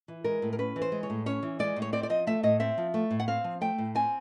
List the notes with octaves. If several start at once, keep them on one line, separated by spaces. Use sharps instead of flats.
E3
G#3 A#4
A2
A#4
C#4 B4
E3
C5
G#3
C#5
A2
C#4 C#5
E3
G#3 D5
A2
C#5
C4 D5
D5
F3 D#5
A3 E5
A2 D#5
C4 E5
F3
A3
A2
F#5
C4 F5
F3
A3 G5
A2
C4 G#5